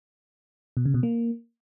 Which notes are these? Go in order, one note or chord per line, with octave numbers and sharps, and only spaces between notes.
B2
C#3
B2
A#3